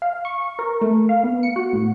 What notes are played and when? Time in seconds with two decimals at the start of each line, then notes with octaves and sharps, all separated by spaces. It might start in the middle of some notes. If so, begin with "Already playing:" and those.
0.02 F5
0.25 C#6
0.59 A#4
0.81 A3
1.09 F5
1.24 B3
1.43 C#7
1.56 F#4
1.73 A2